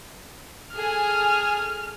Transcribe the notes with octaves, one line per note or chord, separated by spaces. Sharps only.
G#4 A4 G#5 F6